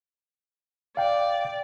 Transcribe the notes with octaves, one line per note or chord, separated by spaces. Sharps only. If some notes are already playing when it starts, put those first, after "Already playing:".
D5 F5 G5